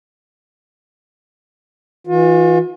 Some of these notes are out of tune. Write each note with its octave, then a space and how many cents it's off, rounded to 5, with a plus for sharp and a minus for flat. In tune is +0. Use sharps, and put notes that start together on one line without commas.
E3 -15 F4 +45